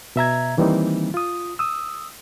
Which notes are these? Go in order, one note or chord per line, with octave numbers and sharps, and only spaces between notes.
B2 E5 A#5 G#6
D#3 E3 G3 A#3 C4 D#4
F4 D#6
D#6 E6